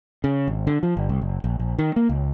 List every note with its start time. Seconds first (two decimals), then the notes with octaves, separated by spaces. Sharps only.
0.24 C#3
0.48 G#1
0.67 D3
0.83 F3
0.97 G1
1.09 C2
1.22 F#1
1.44 A#1
1.59 A#1
1.79 D#3
1.96 A#3
2.09 C#2